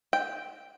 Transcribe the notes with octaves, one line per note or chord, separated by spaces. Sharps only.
G5